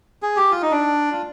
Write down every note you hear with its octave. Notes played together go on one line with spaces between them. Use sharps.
G#4
G4
F4
D#4
D4
F4